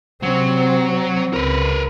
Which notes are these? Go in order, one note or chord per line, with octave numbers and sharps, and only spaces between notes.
C3 F#3 C4
C4
C#2 A#4 B4